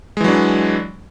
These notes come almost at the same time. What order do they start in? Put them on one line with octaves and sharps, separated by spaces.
G#3 E3 F#3 D4